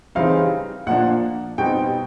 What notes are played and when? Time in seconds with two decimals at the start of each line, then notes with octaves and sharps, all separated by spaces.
0.15 C#3 E3 G3 C4 D#4 F5
0.86 A#2 F3 A#3 D4 F#5
1.58 B2 G3 C4 D#4 G5